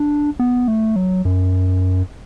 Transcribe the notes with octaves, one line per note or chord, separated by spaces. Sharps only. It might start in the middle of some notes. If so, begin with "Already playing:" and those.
Already playing: D4
B3
A3
F#3
F#2